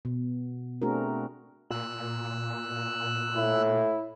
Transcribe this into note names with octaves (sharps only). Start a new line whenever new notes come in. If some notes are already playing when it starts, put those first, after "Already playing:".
B2
A3 C4 D4 F#4 G#4 A#4
A#2 E6 F#6
A2 E4